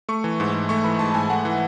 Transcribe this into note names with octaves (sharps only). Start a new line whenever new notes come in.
A3 C#6
E3
G#2
G#2
A3 C#6
E3 B5
G#2 A5
G#2 G#5
A3 F#5
E3